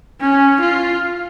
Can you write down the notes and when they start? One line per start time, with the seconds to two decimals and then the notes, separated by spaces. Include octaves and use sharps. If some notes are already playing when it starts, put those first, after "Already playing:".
0.20 C#4
0.60 F4